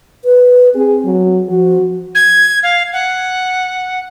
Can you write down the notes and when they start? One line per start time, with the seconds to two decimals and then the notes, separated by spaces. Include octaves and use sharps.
0.25 B4
0.75 C4 G#4
1.05 F#3
1.48 F3 F#4
2.15 G#6
2.63 F5
2.93 F#5